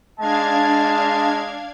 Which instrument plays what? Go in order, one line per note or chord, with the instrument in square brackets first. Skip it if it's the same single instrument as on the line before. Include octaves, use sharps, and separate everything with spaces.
[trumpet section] G#3 D#5 A5 [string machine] D4 F5 G#6